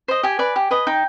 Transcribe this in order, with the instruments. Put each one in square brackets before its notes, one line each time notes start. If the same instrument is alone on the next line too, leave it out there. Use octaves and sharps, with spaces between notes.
[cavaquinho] C5 D#5
G4 G#5
B4 D5
G4
B4 D#5
D#4 G5